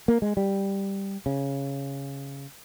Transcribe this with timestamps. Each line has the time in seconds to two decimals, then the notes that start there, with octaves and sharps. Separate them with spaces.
0.08 A#3
0.22 G#3
0.37 G3
1.26 C#3